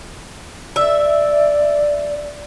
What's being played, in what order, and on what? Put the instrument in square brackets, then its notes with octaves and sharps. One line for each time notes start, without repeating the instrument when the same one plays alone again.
[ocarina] D5 [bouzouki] E5